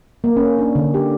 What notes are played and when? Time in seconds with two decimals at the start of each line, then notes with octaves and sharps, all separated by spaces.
0.24 A#3
0.37 C#4
0.59 D4
0.76 D3
0.94 G4